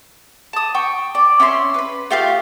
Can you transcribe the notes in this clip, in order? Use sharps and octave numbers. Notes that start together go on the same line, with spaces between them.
A5 D#6
G5 C#6
D5
C#4 E4 G#5 C6
B4 B5
A3 F4 G4 F5